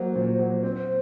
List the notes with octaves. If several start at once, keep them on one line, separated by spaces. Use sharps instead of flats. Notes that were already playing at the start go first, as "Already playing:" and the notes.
Already playing: F#3 A#3 C5
A#2
F#3
C4 C5